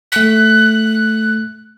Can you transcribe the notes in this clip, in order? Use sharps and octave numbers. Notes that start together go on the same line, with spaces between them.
A3 F#6 B6